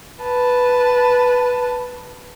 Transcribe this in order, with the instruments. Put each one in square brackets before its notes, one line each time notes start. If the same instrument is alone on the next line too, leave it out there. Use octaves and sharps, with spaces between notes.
[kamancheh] B4 A5